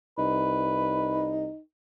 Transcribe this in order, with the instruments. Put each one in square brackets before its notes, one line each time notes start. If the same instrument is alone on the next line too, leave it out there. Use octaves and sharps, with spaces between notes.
[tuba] C2 [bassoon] D#4 [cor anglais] B4